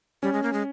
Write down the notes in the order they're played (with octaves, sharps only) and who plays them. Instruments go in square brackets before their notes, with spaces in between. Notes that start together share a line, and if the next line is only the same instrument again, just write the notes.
[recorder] G3 [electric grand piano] C#4
[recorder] G#3
A#3
G#3